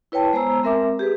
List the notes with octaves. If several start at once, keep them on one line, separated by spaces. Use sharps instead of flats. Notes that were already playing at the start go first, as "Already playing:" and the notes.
E4 B4 C#5 G5 A5
G#3 B3 C5 A#5 E6
G#3 C4 A#4 E5 D6
G4 G#4 B4